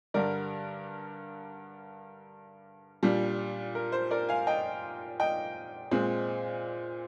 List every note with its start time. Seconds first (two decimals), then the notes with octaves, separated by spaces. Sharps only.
0.14 G2 D3 G3 A#4 D5
3.03 A#2 G3 D4
3.75 A#4
3.92 C5
4.11 A#4 D5
4.29 F5 G#5
4.47 D#5 G5
5.20 D#5 G5
5.91 A#2 G#3 C4